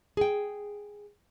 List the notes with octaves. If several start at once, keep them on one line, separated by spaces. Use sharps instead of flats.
G#4 G5